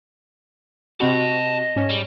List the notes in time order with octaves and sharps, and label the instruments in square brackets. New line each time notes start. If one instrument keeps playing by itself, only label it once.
[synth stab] C3 C4 F#4 [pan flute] D#5 [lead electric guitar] A5 B5
[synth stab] G#2 C#4
[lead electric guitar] G3